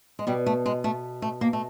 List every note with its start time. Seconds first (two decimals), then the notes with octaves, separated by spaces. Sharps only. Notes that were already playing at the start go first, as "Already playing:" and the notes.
0.19 G#3
0.27 B2 G3
0.46 A3
0.66 G#3
0.84 A3
1.22 A3
1.41 A#3
1.53 A3